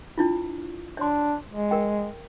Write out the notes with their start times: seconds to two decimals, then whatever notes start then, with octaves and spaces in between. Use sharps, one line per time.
0.18 D4 E4 F4
0.97 D4 C#5 C6
1.49 G#3
1.71 A#4 G5